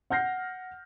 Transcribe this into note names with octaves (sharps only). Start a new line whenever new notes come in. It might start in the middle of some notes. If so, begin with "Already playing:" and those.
F#5 F6 G6 A#6 C7